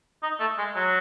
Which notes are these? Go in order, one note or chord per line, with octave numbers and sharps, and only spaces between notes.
D#4
A3
G#3
F#3